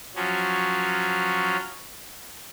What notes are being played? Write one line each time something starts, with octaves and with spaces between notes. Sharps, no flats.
F3 F#3 C#4